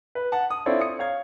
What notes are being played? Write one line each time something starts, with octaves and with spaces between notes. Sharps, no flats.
B4
F#5 A5
D#6
C4 E4 F4 A4 C#5 D5
D#6 C#7
C#5 F5 G#6